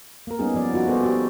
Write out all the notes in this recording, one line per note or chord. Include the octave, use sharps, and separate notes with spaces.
A#3 A#4
G3 B3 C#4 D#4 G#4
F3 A#3 D5
D#4 F4 F#4
B3 G#4 A4 C5 D5
F#4 G4